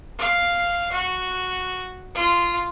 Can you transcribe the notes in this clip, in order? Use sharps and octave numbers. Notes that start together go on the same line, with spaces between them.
F5
F#4
F4